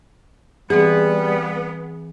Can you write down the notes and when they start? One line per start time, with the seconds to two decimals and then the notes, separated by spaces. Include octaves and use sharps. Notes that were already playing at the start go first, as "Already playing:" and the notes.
0.70 E3 G3 B3 C4 G#4